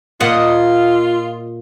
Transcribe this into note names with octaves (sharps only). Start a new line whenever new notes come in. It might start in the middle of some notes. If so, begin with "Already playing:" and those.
A#2 A#3 F4 D#5 F#5